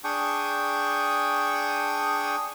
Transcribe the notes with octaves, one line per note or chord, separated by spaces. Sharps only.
D4 G#4 G5 C#6 D#6